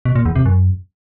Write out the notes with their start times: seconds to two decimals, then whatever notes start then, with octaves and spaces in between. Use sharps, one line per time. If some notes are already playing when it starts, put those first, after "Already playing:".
0.05 B2
0.15 A#2
0.25 E2
0.36 C3
0.46 F#2